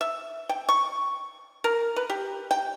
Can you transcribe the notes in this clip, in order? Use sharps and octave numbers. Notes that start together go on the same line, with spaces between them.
E5
G5
C#6
A#4
B4
G4
G5